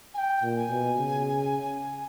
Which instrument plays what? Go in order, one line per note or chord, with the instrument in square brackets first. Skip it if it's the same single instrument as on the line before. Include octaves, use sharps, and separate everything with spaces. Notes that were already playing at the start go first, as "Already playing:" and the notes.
[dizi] G#5
G5
[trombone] A#2
[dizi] G#5
[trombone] B2
C#3